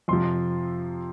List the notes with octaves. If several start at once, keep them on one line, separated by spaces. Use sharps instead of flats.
F2 C3 F3 C6